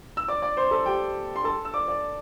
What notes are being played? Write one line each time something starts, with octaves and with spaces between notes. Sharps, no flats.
E6
D5 D6
D5 D6
C5 C6
A4 A5
G4 G5
C6
A4 A5
E6
D5 D6
D5